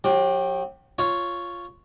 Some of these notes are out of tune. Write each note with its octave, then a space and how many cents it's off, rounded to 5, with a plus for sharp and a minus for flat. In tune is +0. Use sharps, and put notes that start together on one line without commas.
F#3 -35 G4 +0
F4 +0 C#5 +0